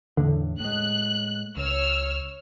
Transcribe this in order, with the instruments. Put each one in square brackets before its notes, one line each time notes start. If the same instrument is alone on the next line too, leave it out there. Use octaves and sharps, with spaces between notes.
[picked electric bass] E2 A2 D4 [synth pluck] D3
[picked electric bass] A2 G#3 [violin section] F#6
[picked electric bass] C#2 [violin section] C#5 E6 F6